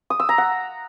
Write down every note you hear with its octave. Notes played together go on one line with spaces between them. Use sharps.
D#6
E6
A#5
F#5